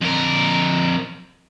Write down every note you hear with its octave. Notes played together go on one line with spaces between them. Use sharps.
F2 A#4